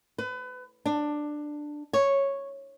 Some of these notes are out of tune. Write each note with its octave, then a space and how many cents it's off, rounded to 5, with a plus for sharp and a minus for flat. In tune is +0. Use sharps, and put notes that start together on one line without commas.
B4 +30
D4 +10
C#5 -5